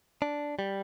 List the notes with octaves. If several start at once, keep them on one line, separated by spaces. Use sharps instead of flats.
D4
G3